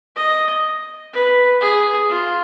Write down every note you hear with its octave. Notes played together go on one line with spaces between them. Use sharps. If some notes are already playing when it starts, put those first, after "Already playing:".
D#5
B4
G#4
F4